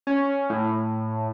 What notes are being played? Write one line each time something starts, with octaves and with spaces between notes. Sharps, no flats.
C#4
A2